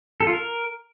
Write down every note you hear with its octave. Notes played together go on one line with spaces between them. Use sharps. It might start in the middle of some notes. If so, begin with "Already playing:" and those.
A4
F4
A#4